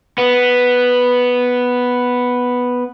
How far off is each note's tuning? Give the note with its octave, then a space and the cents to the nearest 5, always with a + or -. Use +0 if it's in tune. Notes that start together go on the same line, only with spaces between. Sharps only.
B3 +0